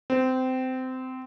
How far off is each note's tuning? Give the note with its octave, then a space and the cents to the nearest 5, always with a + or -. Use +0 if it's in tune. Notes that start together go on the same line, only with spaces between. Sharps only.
C4 -20